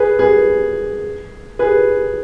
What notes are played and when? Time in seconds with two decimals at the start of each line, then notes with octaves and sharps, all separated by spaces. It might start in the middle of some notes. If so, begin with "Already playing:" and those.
Already playing: G#4 B4
0.19 G#4 B4
1.59 G#4 B4